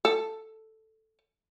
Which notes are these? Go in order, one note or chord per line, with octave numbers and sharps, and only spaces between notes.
A4